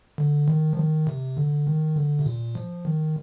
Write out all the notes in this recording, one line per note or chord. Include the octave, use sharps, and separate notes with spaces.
D3
D#3
F3
D#3
C3
D3
D#3
D3
C3
A#2
F3
D#3